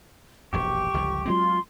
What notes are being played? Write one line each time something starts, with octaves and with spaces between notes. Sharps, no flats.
E1 A#1 F#2 G4 C#6
G1 C#2 F3
F#3 G#3 C4 F4 C6